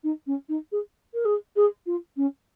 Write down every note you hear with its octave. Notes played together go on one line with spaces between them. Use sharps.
D#4
C#4
D#4
G#4
A#4
G#4
G#4
F4
C#4